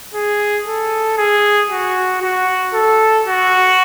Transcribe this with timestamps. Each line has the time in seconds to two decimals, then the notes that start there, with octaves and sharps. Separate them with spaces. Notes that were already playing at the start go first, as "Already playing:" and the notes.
0.14 G#4
0.67 A4
1.18 G#4
1.71 F#4
2.22 F#4
2.74 A4
3.27 F#4